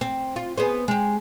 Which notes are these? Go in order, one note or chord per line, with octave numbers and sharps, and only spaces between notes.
C4
F4
B3 G#4 C5
G#3 G4